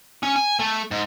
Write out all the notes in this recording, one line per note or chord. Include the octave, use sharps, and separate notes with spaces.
C#4
G#5
A3
G#2